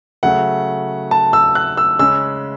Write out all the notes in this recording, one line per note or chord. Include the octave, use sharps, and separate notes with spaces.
C#3 F#3 A3 F#5
A5
E6
F#6
E6
C#3 G#3 C#4 E6